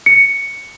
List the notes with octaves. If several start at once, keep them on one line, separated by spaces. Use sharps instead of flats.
C#7